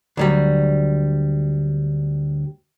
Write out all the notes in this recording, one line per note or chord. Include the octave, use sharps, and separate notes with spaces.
D2 F#3 G3